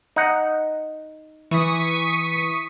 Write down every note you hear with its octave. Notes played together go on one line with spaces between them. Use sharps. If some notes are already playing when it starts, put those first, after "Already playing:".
D#4 F#5
E3 C#6 D#6 B6